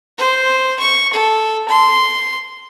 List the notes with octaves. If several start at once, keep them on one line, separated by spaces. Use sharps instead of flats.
C5
C#6
A4
C6